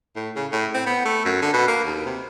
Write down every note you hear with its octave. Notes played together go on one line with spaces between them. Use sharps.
A2
C#3
A2
C4
B3
A3
F#2
D3
B2
A#3
D#2
C3